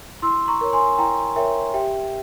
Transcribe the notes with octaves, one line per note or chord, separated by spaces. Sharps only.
E4 C6 E6
A#5 C#6
A#4 C#5
G#5 C6
E4 G5 A#5
A#4 C#5 E5 G5
G4 E5 G5